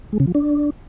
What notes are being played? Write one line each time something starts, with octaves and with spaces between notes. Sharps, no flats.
G#3
C#3
F3
D4